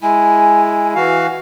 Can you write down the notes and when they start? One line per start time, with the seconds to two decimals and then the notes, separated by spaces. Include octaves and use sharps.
0.02 G#3 E4 G#5
0.95 E3 F#4 F5